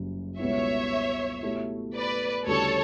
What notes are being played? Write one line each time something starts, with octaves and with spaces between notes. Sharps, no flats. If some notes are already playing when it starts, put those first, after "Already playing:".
Already playing: F#1 F#2 C#3 G3
C#2 B2 G3 B3 E4 C#5 E5
B2 A3 E4 G4
B4 D5
D2 C#3 G3 C#4 E4 A4 C#5